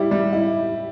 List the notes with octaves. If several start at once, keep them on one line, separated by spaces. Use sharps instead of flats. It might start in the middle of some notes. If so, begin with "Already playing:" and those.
Already playing: G3 E4 G4
G3
E4